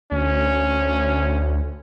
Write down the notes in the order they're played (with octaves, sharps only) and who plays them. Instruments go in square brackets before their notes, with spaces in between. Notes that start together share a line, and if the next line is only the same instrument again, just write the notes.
[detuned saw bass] D2 [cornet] C#4